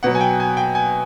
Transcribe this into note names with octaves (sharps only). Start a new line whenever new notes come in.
B2 F#3 F#5
G#5
G5
G#5
G5
G#5